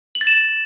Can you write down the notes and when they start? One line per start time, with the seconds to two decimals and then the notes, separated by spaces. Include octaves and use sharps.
0.15 F#7
0.21 A6
0.27 E7